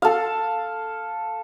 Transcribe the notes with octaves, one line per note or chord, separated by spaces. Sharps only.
A4 F5